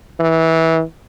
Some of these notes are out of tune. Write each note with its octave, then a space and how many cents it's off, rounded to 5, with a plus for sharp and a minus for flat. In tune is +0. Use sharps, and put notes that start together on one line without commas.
E3 -20